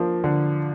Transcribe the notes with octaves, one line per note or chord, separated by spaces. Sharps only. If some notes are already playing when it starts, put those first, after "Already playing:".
Already playing: F3 A#3 D4
D3